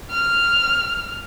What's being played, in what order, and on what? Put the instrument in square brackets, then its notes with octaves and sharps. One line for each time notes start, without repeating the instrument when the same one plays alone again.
[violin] F6